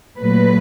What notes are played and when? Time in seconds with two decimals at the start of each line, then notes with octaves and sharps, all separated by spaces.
0.19 A#2 F#3 A3 B4